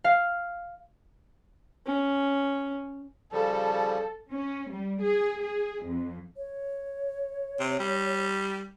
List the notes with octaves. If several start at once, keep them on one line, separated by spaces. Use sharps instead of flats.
F5
C#4
C#3 F3 G3 A4
C#4
G3
G#4
G#4
F2
C#5
C3
G3